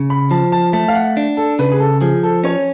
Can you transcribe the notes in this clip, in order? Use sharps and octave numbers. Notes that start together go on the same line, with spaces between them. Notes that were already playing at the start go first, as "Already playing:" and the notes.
Already playing: C#3
B5
F3 A5
A5
A3 A5
F5
F#5
D4
A4
C#3 B4
G#4
A4
F3 G#4
A4
C#4 C#5